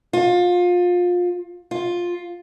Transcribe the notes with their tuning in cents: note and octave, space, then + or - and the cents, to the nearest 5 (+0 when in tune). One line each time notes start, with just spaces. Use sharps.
F4 +25
F4 +10